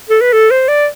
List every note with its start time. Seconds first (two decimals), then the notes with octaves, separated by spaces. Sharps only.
0.10 A4
0.21 B4
0.33 A4
0.51 C5
0.68 D5